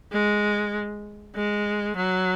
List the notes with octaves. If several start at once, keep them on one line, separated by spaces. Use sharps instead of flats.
G#3
G#3
F#3